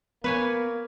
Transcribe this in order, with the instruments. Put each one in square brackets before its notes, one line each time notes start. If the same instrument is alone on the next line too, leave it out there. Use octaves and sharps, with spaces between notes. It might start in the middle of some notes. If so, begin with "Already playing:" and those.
[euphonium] A#3 [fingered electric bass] B3 [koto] B4 C#5 G#5